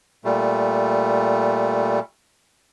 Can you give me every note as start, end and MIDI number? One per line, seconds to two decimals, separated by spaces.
0.25 1.99 46
0.25 1.99 55
0.25 1.99 57